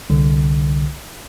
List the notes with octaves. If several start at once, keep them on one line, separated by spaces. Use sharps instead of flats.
C2 D3